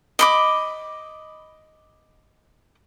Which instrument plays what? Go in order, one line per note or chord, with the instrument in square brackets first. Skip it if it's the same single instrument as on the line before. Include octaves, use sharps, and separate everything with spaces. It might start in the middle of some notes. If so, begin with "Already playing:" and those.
[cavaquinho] D#5 B5 D6